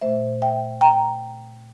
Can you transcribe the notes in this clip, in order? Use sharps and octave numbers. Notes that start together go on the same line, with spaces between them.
A#2 A3 C5 E5
E5 G5
G5 A#5